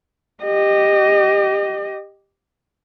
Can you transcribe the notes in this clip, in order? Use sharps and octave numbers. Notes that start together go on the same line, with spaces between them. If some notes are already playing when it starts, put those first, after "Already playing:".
G4 D#5